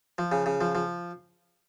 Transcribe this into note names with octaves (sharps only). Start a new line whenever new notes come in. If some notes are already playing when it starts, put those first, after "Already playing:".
F3
C#3
C#3
F3
F3